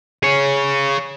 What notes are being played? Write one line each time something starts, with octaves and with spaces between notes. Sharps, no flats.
G#4 C#5